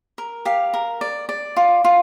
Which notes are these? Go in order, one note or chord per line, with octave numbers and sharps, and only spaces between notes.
A#4
G4 F5
A#4
D5
D5
F4
F4